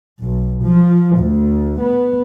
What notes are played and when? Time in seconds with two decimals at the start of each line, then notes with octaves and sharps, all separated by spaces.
0.22 B1
0.64 F3
1.17 D2
1.81 B3